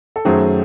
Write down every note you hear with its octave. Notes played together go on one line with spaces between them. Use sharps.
A4
F#2 D#3 F#3 A3 G#4 C5